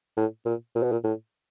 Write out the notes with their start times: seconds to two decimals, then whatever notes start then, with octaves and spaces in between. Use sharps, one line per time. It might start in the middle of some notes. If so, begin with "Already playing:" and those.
0.17 A2
0.45 A#2
0.75 A#2
0.83 B2
0.92 A#2
1.04 A2